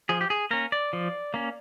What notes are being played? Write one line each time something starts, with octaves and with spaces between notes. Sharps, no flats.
F3 G#4
G4
G#4
A#3 C#4 A#4
D5
F3
A#3 C#4